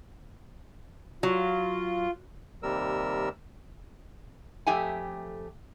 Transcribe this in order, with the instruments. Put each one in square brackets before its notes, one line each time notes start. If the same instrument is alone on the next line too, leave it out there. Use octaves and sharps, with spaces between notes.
[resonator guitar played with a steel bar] F#3 [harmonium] F4
[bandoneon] D#2 C3 G3 A#4 E6
[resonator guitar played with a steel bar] F2 A3 G4 E5 G5 G#5